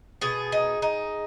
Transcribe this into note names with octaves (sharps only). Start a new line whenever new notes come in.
B2 G#4
D#4
D#4